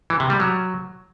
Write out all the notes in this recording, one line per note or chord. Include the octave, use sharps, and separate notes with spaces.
E3
C3
G3
F#3